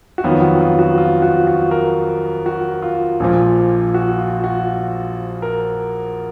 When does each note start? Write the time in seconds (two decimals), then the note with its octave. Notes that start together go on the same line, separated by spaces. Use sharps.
0.18 F#4
0.24 F2 D#3 F#3 B3 F4
0.42 F#4
0.61 F4
0.79 F#4
0.98 F4
1.22 F#4
1.47 F#4
1.71 A#4
2.46 F#4
2.82 F4
3.20 A#1 A#2 F3
3.94 F#4
4.19 F4
4.44 F#4
5.42 A#4